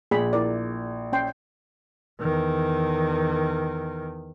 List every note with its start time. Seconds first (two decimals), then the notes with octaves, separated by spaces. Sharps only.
0.11 A#1 G#4 B5
0.33 E4 A#4 D5
1.13 C#4 G5 C6
2.20 E2 D#3